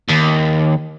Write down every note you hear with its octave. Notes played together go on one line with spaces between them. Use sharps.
D#2